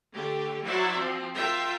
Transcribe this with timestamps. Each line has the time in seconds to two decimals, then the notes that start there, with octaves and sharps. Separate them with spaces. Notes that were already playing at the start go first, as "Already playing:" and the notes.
0.13 D3 A3 G4
0.64 F#3 E4 F#4 C5 D5 E5
0.97 F3 C4
1.34 F4 A#4 E5 G5